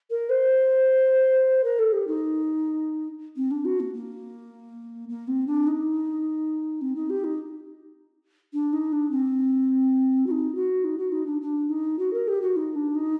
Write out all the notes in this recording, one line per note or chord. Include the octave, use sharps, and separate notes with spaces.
A#4
C5
A#4
A4
G4
D#4
C4
D4
F#4
A#3
A#3
A#3
C4
D4
D#4
C4
D#4
G4
D#4
D4
D#4
D4
C4
F#4
D#4
F#4
D#4
F#4
D#4
D4
D4
D#4
F#4
A#4
G4
F#4
D#4
D4
D#4